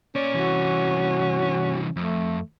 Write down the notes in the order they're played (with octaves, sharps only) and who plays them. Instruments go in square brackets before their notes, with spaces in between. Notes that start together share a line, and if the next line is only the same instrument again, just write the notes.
[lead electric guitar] A#3 D5 [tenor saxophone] C#4
[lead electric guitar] C2 E3 [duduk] F#4
[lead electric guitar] F2 [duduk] A3